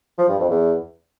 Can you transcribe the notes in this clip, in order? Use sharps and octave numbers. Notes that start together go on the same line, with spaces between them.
F3
G2
F2
E2